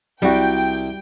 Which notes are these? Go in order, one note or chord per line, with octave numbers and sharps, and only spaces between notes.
C2 G3 F#4 G5